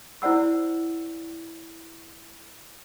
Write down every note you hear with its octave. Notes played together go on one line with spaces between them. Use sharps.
E4 C5 D5 F#5 E6